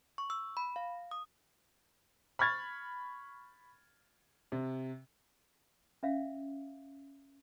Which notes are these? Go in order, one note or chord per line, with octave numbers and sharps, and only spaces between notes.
C#6
E6
B5
F5
D#6
B5 C#6 F6 G#6 A6
C3
C#4 E5 F5